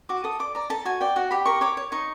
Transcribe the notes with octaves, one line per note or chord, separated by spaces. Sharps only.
F#4 D6
A4 D#6
D5 D6
D5 A#5
A4 A5
F#4 G#5
D5 G5
F#4 F#5
G4 B5
A#4 C#6
C#5 D6
C#5
D#4 C#6